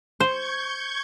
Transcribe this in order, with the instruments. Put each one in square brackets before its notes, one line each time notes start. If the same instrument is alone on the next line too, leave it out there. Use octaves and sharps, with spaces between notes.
[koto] C5 [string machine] C#6 G6 G#6